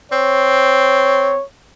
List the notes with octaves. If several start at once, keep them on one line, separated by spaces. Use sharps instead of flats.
C4 C#5